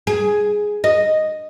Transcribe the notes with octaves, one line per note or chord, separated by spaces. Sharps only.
G#4
D#5